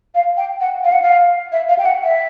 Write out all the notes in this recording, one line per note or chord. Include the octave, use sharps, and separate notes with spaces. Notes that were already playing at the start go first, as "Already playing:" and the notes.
F5
G5
F#5
F5
F#5
F5
E5
F5
G5
F#5
E5